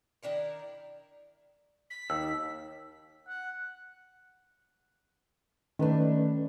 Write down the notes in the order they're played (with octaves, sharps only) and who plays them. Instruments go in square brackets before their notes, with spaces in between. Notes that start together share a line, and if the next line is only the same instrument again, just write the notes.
[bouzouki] D#3 D4 E4 A#4
[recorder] B6
[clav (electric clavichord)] D#2 [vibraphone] D#4 [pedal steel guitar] E6
[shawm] F#5
[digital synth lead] D#3 [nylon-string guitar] A3 D4 [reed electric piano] C#4 B4 D5